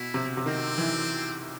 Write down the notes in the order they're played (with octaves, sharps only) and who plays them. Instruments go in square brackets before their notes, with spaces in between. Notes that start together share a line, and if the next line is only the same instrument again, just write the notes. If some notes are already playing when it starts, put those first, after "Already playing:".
Already playing: [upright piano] B2 [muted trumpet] E4
[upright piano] C3
C3
[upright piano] D#3 [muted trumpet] C4
[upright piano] E3